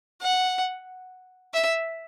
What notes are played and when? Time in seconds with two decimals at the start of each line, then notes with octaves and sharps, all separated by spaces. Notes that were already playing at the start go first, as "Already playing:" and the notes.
0.21 F#5
1.54 E5